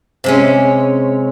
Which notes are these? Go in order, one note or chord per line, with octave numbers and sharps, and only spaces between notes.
C3 G#3 C#4